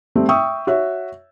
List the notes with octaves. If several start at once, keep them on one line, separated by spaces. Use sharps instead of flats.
G3 A3 C4
E5 G5 C#6 D#6 E6
F#4 C#5 E5